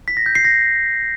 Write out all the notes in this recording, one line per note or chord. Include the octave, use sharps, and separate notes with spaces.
B6
A#6
G6
C7
A#6